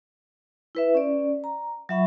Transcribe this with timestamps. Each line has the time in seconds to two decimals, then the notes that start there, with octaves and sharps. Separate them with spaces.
0.75 E4 B4 E5
0.95 C#4 D5
1.44 A#5
1.89 F#3 F4 E5 F#5 B5 C#6